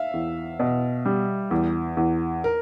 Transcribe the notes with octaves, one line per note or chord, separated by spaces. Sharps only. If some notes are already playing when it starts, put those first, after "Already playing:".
Already playing: E5 F5
E2
B2
G3
E2
E2
A#4